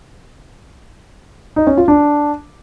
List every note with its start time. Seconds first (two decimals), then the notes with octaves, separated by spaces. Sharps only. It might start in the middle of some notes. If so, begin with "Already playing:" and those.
1.56 D#4
1.67 C#4
1.77 F4
1.88 D4